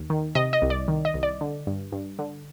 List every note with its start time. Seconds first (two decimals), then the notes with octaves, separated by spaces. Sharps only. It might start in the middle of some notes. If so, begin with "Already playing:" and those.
Already playing: D#2
0.10 D#3
0.35 C3 D#5
0.53 D#5
0.62 C2
0.70 D5
0.88 D#3
1.05 D#5
1.14 C2
1.23 D5
1.41 D3
1.67 G2
1.92 G2
2.19 D3